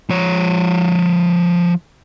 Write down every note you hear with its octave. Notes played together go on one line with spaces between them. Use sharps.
F3 C#5